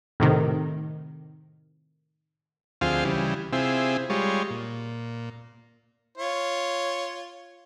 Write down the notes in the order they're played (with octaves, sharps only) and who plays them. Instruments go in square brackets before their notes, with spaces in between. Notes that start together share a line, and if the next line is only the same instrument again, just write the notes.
[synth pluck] A2 C3 D#3
[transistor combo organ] D2 F3 C4 F4 G#4 F5
C#3 E3 G3
C3 C4 E4 F4 G#4
G3 G#3 F4 C#5
A#2
[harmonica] F4 C#5